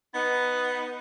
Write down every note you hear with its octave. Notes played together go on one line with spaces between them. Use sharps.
B3 D#4